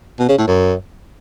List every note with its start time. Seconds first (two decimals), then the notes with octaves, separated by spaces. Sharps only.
0.19 B2
0.29 C#3
0.38 A2
0.47 F#2